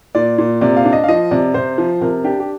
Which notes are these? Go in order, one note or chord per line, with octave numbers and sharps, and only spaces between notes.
A#2 D5
A#2
C3 D5
F5
D4
D#5
F5
F3 D#5
C3 D5
C3 C5
F3
C3 A#4
D4 G4
G4